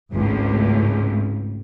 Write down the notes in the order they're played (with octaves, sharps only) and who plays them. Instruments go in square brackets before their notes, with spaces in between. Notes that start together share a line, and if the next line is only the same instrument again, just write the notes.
[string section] G#1 C#2 A2